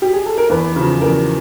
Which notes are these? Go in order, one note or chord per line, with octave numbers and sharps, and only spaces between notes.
G4
G#4
A4
A#4
E2 B4
C#3 F3
E2 A#4